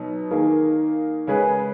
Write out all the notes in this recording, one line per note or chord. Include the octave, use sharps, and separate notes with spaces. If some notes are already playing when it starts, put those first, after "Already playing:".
Already playing: B2 F#3 B3 D#4
D#3 A#3 D#4 G#4
C#3 G#3 C#4 G#4 B4